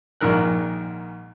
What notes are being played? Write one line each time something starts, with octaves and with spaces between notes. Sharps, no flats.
A#1 G#2 D#3 A#4 F#6